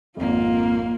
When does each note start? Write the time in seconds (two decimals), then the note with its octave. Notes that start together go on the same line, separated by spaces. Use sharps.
0.17 G#1 F2 A#3 F4